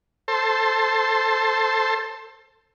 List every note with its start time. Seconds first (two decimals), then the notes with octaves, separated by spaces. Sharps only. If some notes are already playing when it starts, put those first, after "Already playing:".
0.28 A4 C5